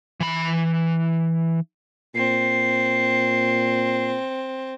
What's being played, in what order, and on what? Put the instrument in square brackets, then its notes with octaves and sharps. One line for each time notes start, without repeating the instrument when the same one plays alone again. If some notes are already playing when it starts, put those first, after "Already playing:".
[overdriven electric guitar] E3 B5
[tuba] A#2 [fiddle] C4 [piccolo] C7